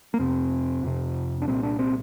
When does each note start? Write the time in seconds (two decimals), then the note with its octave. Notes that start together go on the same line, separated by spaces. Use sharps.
0.14 A#3
0.19 F2 C3 C4
0.83 F2 C3
1.42 D4
1.47 C2 A#2 C4
1.63 D4
1.79 C4